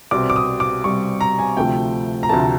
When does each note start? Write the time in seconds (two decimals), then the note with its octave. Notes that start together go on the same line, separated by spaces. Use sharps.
0.11 C2 B2 G3 C4 D6
0.30 D6
0.36 D#6
0.60 D6
0.84 C2 B2 G3 C4 C#6
1.21 A#5
1.39 G#5
1.57 D2 C3 F3 A3 G5
2.23 A#5
2.29 D2 C3 F3 A3 A5